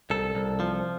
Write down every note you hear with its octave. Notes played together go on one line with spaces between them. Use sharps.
C2 A4
C2
F3